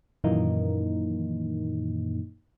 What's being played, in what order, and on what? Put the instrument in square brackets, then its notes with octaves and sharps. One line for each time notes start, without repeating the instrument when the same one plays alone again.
[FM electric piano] F#2 A#2 D#3 E3 A#3 D#4